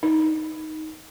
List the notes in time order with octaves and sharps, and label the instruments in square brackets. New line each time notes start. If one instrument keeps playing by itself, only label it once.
[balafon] D#4